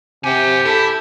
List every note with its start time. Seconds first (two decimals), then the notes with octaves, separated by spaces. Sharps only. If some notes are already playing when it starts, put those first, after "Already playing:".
0.24 C3 G4 F#5 G#5
0.66 E4 A4